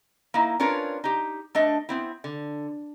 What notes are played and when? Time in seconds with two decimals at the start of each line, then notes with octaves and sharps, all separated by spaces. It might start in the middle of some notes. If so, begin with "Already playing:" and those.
0.34 A#3 D#4 E4
0.60 C#4 D4 F4 A#4 B4 C#5
1.04 D#4 G4
1.55 A3 D4 D#5
1.89 B3 C4 E4
2.24 D3